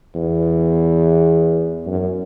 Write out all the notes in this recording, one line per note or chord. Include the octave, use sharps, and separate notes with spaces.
E2
F#2